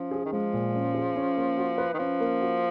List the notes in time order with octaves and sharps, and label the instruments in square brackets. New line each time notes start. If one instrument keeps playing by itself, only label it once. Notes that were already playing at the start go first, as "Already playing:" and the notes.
Already playing: [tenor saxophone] F3 [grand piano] C#4
[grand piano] G#4
[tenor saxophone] D#3
[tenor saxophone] F3 [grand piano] G#3
[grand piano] A#2
C#4
G#4
C#4
A#3
F#4
B4
[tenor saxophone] D#3
[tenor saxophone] F3 [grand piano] C#4
[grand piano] A#3
F#4